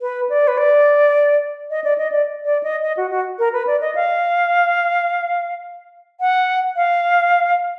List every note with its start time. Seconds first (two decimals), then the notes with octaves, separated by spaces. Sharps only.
0.01 B4
0.29 D5
0.48 B4
0.58 D5
1.70 D#5
1.84 D5
1.98 D#5
2.12 D5
2.45 D5
2.63 D#5
2.83 D#5
2.97 F#4
3.11 F#4
3.39 A#4
3.53 B4
3.67 D5
3.81 D#5
3.95 F5
6.20 F#5
6.76 F5